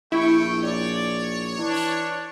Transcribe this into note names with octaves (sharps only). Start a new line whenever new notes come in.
A#1 A3 E4 G5 C#6
C#5 D5
E3 D4